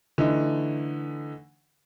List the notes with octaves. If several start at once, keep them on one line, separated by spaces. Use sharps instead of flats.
D3 E3 A3 D#4